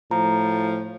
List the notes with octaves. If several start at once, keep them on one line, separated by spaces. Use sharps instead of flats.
A2 F3 A#5